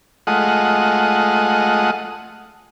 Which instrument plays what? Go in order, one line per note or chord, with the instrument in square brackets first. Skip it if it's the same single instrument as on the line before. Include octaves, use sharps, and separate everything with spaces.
[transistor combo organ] G#3 A3 F4 D#5 F#5